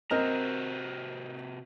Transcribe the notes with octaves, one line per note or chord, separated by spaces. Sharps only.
C3 C4 F#4 A#4 D#5 A#5